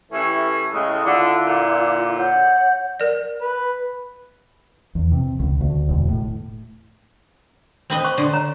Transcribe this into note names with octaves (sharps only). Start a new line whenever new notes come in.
E3 A3 C#4 G4
A2 C#3 G#3 D#5
D3 E4 F4 D6
A#2 D3
C#5 F#5 G6
A#4 D5
B4
E2
C3
C#2
D2
E1
A2
C4 B4 D#5
C5 C6 C#6
D3
C#5 A#5